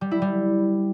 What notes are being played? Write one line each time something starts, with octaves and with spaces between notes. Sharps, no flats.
G3
E4
G3